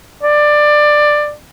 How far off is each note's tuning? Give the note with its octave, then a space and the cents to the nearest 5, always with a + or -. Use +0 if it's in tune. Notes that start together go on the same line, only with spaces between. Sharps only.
D5 +15